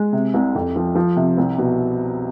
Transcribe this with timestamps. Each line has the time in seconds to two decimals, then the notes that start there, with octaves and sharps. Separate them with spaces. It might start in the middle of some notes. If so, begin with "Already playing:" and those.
Already playing: G#3
0.13 C3
0.34 C2
0.55 F2
0.76 F3
0.95 F3
1.16 C3
1.38 C2
1.58 B2